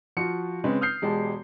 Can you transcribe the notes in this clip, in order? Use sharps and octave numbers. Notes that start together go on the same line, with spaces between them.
F3 F4 F#4 C#7
C#3 G#3 C4 C#4 B4
D#6 F6 G6 C7
E1 G#3 G4 A5